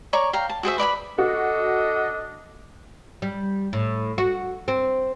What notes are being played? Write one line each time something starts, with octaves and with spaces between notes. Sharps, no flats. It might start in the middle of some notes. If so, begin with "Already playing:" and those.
C#5 D5 A#5 C#6
F5 G5 A#5
A5
F#4 G#4 C5 E5
B4 D5 A#5 B5
D4 F#4 A4 D#5
G3
A2
F#4
C4